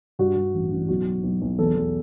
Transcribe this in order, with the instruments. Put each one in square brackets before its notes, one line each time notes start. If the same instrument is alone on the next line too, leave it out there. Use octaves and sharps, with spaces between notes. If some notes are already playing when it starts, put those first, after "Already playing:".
[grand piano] G2 F#4
G2
A1
A1
B1 F#4
F#3
B1
B1
E2 A4
E2